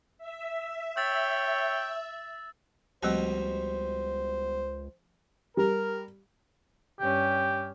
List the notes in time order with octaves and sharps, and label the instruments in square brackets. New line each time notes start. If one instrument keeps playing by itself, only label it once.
[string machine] E5
[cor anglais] C#5 [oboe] G5 [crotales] E6 A6
[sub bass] C#2 [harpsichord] B2 G3 A#5 [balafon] F3 A3 C4 [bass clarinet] C5
[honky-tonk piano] G3 [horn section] A#4
[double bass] G2 C#4 [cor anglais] G4